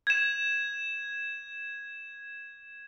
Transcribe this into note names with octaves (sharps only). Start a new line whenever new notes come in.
G#6 E7